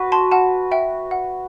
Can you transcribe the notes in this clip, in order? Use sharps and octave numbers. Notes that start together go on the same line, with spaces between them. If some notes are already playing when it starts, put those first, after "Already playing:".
Already playing: F#4 B4
A5 C6
F#5 A5
E5 G5
F#5